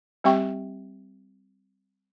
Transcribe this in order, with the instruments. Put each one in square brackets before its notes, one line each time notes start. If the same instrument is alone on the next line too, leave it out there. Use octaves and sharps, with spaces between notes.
[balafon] G3 C4 G4 E5 G5 C#6